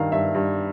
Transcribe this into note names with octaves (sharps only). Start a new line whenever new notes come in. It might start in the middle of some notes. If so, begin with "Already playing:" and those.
Already playing: G2 D#3 F5
G2 E5
G2